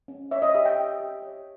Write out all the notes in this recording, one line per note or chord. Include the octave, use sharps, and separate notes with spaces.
C#4
C#5 E5
D#5
G4 E5
G5
G4
G4
C#5